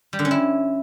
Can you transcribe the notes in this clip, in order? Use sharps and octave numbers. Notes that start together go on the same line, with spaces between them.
G3
D3
C#4
E4